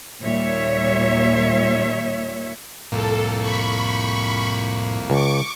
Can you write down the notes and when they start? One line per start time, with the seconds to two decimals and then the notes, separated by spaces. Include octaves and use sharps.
0.22 D#2 A#2 G3 C#5 E5
2.92 C2 F2 A2 A#3 A4
3.40 B5 C#6
5.10 C#2 C#6 D6